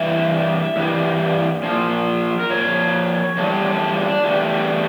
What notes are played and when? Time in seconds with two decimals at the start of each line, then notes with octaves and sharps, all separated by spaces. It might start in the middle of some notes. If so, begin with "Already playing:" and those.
Already playing: G2 E3 E5
0.76 G2 E3 G3
1.63 A#2 F3
2.40 A#4
2.50 A#2 F3 C#5
3.38 E2 D3 G3 A4
3.66 A4
3.95 D4
4.24 E2 D3 G3 A3